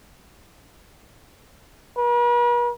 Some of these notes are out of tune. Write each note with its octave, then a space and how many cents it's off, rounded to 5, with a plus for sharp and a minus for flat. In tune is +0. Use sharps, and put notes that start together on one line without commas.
B4 -45